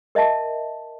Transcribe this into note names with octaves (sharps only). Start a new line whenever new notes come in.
A#4 D#5 E5 A5